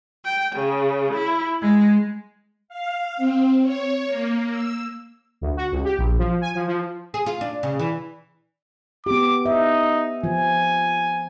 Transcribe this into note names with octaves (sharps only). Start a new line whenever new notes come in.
G5
C#3
E4
G#3
F5
C4
C#5
A#3
E6
D2
F#4
C#2
G4
A#1
F3
G#5
F3
F3
G#4
F4
D4
C#3
E3
B3 G4 D6
D#4 E5
F3 G#5